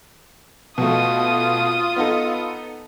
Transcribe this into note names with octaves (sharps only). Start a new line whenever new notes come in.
B2 A3 F4 D#6
B3 D#4 A4